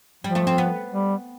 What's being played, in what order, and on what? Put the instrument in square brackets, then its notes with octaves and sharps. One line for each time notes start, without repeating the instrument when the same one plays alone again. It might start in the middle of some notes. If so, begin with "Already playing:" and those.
[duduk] F3 [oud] G3
[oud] A3
C4
B3
[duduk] G3